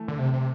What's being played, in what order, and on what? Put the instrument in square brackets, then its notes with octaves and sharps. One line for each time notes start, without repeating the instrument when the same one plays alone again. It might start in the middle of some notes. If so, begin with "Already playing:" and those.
Already playing: [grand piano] E3 A3
[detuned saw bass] D3
C3
C3